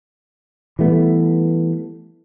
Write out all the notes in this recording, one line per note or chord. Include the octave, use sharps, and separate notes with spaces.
E3 G3 A3 B3